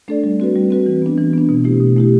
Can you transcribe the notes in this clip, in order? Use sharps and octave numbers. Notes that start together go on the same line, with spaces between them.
A3 D4 A4 D5
G3
C4 F#4 B4
G3
C4 F#4 B4
E3
B3 D4
E3
B3 D4
B2
A3 E4 G4
B2
A3 E4 G4